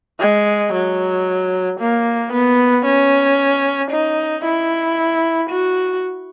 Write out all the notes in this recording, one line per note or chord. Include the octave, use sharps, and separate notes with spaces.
G#3
F#3
A#3
B3
C#4
D#4
E4
F#4